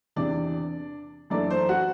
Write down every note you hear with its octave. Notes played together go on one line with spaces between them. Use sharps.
E2 C3 E3 D4 D5
F#2 E3 A3 D4 D5
C5
F#4 F#5